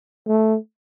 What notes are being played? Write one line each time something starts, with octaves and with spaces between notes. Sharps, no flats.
A3